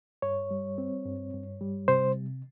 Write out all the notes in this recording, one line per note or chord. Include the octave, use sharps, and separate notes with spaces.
G2 C#5
G3
C4
G2
G2
G3
C3 C5